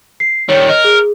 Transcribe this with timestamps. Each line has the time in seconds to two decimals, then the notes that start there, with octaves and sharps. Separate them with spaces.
0.20 C7
0.49 D#3 G3 C#5
0.69 A#4 D#5
0.84 G#4